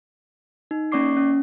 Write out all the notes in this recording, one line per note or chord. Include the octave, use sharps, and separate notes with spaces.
D#4
A#3 C#4 D5 C#6 D6 C7
C#4